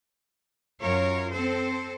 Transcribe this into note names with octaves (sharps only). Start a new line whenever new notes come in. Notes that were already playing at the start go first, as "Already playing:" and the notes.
F#2 F4 A#4 C#5
C4 A4 C5